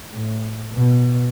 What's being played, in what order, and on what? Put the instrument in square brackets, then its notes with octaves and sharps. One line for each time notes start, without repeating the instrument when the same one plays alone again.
[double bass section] A2
B2